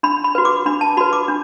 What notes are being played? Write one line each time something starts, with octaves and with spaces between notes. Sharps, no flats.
D4 B5
B5
F#4 B4
D6
D4 B5
A5
F#4 B4 B5
D6
D4